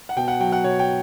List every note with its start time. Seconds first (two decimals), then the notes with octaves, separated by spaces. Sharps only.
0.09 F#5
0.17 B2 G5
0.28 F#5
0.40 F#3 G5
0.52 F#5
0.64 B2 C#5
0.79 G5